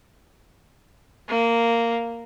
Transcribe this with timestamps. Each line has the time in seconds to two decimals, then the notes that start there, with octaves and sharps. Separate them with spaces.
1.29 A#3